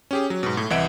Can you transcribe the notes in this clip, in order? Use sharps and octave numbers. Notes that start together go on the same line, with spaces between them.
C#4 G4 G#4
F#3
G#2 B2
A2
C2 E3 D#5 E5 F#5 D7